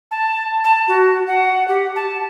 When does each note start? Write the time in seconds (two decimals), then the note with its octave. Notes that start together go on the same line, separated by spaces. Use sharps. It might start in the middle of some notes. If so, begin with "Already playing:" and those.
0.11 A5
0.64 A5
0.88 F#4
1.27 F#5
1.68 G4
1.96 A5